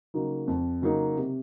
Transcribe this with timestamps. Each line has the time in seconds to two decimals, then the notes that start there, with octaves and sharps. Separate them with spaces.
0.14 C#3 F#3 A#3 D#4
0.48 F2
0.82 C#3 F#3 A#3 D#4
1.17 C3